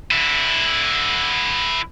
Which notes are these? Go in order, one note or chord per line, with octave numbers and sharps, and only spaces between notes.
D3 E4